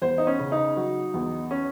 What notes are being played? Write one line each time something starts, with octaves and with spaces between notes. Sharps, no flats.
E2 C5
D#4
C#4
C#3
D#4
F#3
E2
C#4